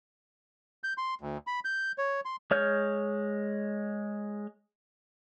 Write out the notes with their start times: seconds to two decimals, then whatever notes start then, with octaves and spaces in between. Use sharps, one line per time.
0.84 G6
0.98 C6
1.21 D2
1.47 B5
1.65 G6
1.98 C#5
2.25 C6
2.51 G#3 C#5 F6 G6